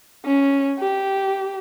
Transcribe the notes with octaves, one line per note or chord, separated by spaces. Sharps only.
C#4
G4